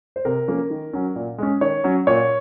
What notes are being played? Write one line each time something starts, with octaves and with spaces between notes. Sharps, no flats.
C5
C3 A#4
F3 A#3 C#4
D#3
F#3 C#4
A#2
G#3 C#4
D#3 C#5
F#3 C#4
A#2 C#5